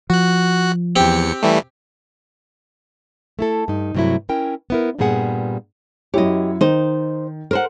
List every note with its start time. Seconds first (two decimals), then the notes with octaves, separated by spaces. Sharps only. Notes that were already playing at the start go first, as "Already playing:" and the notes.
0.10 F3 F#4 F#6
0.96 E2 C4 G4 C#7
1.43 E3 G3 A3
3.39 A3 E4 A4
3.68 G2 D#4
3.95 G2 C3 F#3 A3 E4
4.29 C#4 E4 A#4 G5
4.70 B3 E4 A#4
4.98 G2 A#2 G3 B3 G#4 F#5
6.14 F#2 E4 G4 C#5 D#5
6.61 D#3 D#4 C5
7.51 A#4 C5 F#5